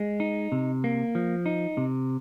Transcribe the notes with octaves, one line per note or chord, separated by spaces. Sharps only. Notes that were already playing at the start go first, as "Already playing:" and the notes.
Already playing: G#3
D#4
C3
A#3
F3
D#4
C3